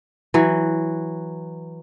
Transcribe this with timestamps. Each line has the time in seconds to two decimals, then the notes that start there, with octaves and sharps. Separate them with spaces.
0.34 E3 F#3